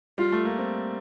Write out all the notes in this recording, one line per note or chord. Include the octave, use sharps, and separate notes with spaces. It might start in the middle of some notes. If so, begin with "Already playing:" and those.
G3 F4
A3
A#3
C4